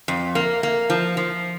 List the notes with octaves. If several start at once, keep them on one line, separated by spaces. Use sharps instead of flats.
F2
A#3
A#3
F3
F3